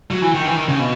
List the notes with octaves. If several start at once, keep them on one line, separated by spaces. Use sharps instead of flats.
F#3
E3
D#3
E3
D#3
C#3
B2